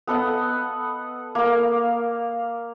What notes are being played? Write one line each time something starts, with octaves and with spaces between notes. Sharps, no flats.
B3 A4 D#5 F#5
A#3 F5